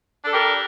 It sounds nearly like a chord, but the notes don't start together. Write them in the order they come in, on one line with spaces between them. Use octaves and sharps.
D4 A4 G4 A#4